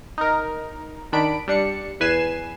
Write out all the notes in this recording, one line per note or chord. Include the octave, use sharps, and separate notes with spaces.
D#4 A#4
D#3 D4 B5 D7
G3 D4 C#7
E2 B4 G#5 C7 E7